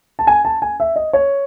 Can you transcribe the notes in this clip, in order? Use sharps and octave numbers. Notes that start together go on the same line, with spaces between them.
A5
G#5
A5
G#5
E5
D#5
C#5